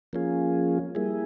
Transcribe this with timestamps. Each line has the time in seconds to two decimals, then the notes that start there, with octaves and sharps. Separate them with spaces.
0.13 F3 A#3 C#4 F4 G#4
0.95 G3 A#3 E4 G#4